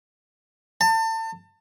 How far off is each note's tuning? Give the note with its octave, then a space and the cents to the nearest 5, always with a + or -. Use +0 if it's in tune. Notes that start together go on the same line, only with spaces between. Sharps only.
A5 +30